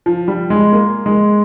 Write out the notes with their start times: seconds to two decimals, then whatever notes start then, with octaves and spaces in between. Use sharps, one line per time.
0.06 F3
0.28 G3
0.50 G#3
0.72 A#3
1.06 G#3